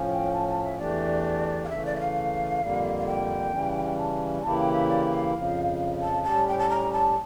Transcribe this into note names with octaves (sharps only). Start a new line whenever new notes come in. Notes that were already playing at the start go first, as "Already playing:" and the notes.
Already playing: A2 F3 C#4
G5
A5
A5
E5
E2 E3 A3 D4 G4 D5
F5
C#3 E3 A3 E5
D5
E5
F5
F2 D3 G3 A#3
F5
G5
C#3 E3 G3 C#4
G5
A5
C#3 E3 A#3 E4 G4 A5
G5
E5
D5
G5
F5
F2 C#3 F3
A5
A2 G3 C#4 G4 A5
G5
A5
A#5
A5